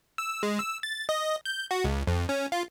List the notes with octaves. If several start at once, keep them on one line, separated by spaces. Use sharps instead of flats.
E6
G#3
E6
A6
D#5
G6
F#4
C#2
F2
C#4
F4